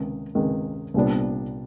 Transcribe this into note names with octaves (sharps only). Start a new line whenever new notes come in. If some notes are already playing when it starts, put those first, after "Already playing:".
Already playing: C#2 C3 D#3
C#2 C3 D#3 G#3
C2 A#2 G3 B3 D4